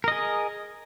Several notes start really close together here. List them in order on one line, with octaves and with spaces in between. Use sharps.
A#4 D#5 G#4